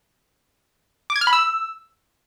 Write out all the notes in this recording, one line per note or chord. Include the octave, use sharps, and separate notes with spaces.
D6
G#6
F6
B5
E6